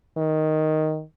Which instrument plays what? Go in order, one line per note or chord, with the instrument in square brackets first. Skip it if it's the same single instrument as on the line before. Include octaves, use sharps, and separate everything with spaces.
[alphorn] D#3